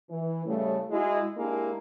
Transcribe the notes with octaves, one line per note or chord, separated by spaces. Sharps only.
E3
A2 C#3 G3 A3
G#3 E4 F#4
G#3 A#3 D4 E4 G4 G#4